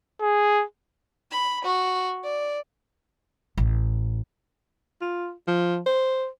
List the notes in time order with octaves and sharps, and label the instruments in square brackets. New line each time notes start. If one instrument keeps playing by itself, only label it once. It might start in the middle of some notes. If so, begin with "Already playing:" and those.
[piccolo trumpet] G#4
[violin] B5
F#4
D5
[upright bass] A1
[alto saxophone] F4
F3
C5